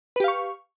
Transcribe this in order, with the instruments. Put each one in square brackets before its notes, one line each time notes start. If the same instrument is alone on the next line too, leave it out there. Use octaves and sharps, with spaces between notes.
[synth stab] B4
G4
F5
C#6